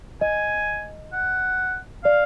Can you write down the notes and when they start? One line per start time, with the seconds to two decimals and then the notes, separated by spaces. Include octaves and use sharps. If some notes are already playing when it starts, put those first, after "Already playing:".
0.21 D#5 G#5
1.13 F#5
2.04 D5 F5